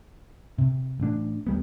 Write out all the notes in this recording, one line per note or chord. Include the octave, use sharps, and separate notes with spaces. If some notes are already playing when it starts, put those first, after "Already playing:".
C3
A1 D4
D#2 G3 B3